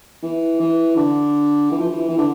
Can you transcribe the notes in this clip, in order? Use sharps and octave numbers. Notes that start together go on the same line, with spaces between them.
E3
E3
D3
E3
F3
E3
E3
D3